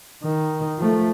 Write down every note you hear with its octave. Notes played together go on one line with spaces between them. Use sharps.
D#3
F3 A3